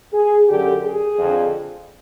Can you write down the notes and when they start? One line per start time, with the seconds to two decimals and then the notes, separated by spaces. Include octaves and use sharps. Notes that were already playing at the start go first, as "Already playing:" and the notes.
0.12 G#4
0.48 F#2 D3 G4
0.84 G#4
1.19 F2 D3